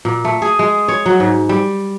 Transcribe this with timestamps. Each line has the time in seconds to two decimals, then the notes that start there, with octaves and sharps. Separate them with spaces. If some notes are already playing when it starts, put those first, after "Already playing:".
0.05 A#2
0.25 A3
0.42 G#4
0.59 G#3
0.88 C#5
1.06 F#3
1.20 G#2
1.49 G3